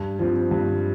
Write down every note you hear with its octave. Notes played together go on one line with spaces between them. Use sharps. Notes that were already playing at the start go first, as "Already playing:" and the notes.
Already playing: G2
F3 C4
G2